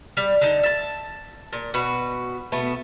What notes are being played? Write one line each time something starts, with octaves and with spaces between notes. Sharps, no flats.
G3
D3 D#4
E5 A5
A#2
B2 F#4 B4
B2 A3 B3